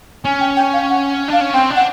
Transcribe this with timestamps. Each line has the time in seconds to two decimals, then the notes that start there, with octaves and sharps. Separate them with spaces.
0.24 C#4 G#5
0.40 G5
0.56 G5
0.73 F5
0.90 F#5
1.28 D4 F5
1.41 C#4
1.54 C4 G5
1.70 D4
1.76 F#5